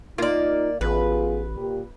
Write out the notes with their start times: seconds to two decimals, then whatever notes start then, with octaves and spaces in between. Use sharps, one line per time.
0.18 A#3 D#4 F4 D5
0.81 A1 B3 F4 G#4 B4
1.56 A#2 G4